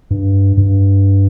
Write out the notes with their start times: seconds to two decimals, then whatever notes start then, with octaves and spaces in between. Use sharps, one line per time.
0.11 G2
0.58 G2